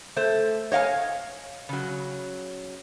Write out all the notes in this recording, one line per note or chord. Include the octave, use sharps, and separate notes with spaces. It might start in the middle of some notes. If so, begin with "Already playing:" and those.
A3 C5
C#5 D#5 F5 G5 G#5
C#3 F#3